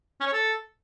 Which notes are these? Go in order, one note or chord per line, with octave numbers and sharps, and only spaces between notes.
C#4
C#5
A4